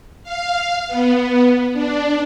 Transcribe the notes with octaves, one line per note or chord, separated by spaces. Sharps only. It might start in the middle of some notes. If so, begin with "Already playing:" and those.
F5
B3
D4